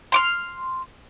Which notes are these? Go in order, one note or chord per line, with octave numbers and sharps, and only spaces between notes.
C6 D6 F6